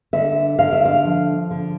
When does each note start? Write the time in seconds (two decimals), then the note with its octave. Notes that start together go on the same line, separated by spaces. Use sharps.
0.13 D3 E5
0.59 D3 F5
0.73 E5
0.85 F5
1.05 F3
1.51 D3